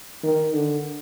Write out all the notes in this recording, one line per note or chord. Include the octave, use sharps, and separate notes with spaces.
D#3
D3